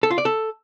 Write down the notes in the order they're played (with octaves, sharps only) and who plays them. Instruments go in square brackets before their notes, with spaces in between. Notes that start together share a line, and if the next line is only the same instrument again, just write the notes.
[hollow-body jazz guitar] A4
F4
D5
A4